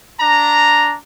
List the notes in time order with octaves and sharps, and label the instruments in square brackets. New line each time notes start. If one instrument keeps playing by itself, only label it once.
[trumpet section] D4 A#5